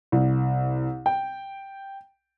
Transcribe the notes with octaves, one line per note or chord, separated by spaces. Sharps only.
C2
G5